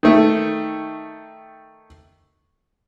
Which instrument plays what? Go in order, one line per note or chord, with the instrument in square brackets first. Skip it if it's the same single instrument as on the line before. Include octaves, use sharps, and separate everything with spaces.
[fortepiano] D#3 A3